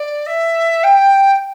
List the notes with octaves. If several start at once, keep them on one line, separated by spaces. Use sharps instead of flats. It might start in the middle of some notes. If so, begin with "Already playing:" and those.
Already playing: D5
E5
G5